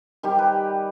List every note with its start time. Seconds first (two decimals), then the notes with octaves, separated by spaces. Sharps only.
0.23 D#3 G3 G4
0.39 B4